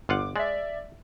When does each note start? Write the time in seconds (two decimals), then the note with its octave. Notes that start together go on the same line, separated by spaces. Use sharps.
0.09 G1 F4 F#5 D6
0.36 G#3 D5 E5